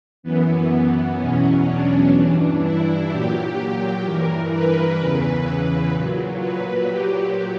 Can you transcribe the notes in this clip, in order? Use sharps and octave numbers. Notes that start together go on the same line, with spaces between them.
F#2 E3 B3
E2 B2 F#3 C#4
D4
G2 E3
E4
A#2 F#3 G4
G2 E3 A#4
B4
E2 C#3 E3
A#2 F#3
B4
A#2 F#3 G4